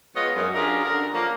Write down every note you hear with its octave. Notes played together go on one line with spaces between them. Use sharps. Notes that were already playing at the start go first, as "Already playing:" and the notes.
F3 G#3 B3 F4 C#5 D#5
F#2
C#4 D4 F4 G4 G#4 A#4
D3 A#4
F3 A#3 C#4